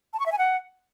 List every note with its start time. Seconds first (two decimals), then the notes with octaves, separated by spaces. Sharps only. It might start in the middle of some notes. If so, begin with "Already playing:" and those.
0.13 A5
0.20 C#6
0.26 E5
0.32 G#5
0.38 F#5